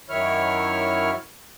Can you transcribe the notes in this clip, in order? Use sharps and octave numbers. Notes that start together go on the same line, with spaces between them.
F#2 D#3 E4 C#5 F6